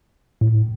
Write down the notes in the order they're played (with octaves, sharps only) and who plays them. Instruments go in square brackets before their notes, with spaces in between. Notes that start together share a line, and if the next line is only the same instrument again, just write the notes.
[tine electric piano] A2